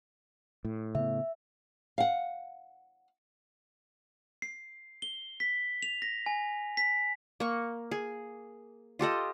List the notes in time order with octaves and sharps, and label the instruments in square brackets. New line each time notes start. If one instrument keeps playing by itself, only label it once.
[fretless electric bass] A2
[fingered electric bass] C#3 B3 [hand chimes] E5
[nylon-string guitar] F5 F#5
[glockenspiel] C7
G7
B6
F7
A#6
G#5
B6
[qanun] A#3 C#6
G#4
F4 G4 A4 D#5